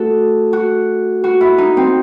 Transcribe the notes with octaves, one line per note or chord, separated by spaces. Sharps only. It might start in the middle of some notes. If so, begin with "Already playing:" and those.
Already playing: A3 F#4 A4
F#4
F#4
E4
D#4
C4